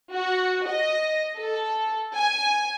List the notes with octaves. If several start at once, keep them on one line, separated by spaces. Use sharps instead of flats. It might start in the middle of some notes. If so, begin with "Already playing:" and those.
F#4
D#5
A4
G#5